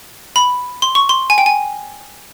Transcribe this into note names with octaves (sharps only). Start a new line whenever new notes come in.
B5
C6
C#6
C6
G#5
G5
G#5